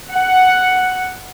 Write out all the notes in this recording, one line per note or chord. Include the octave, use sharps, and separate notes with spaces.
F#5